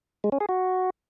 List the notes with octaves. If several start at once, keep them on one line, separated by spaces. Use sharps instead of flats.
G#3
C#4
G#4
F#4